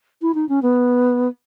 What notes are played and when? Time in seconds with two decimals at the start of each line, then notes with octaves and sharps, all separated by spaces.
0.22 E4
0.35 D#4
0.49 C#4
0.62 B3